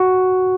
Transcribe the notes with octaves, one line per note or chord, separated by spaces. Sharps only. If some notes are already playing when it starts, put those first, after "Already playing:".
Already playing: F#4